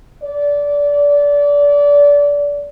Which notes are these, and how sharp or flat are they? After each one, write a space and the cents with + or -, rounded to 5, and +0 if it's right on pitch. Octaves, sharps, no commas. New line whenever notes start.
D5 -25